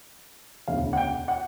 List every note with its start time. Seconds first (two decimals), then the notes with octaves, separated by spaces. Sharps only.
0.68 E1 D2 C#3 F5
0.93 F#5
0.97 G5
1.28 F#5